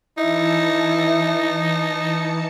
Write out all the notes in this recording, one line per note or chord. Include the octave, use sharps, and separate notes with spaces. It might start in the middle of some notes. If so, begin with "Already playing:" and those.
E3 D#4 E4 A5 C#7